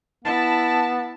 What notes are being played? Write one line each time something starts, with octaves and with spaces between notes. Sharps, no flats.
B3 E4 A5